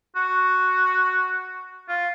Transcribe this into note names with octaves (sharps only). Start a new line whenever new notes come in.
F#4
F4